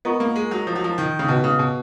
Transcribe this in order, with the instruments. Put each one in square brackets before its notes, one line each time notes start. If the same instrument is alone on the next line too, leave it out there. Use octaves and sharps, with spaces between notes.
[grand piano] B3 [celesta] F4 A#4 D#5 A#5 C#6
[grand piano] A#3
G#3
F#3
F3
F#3
F3
D#3
C#3
[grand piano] B2 [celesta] F#4 B4 D#5
[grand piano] C#3
B2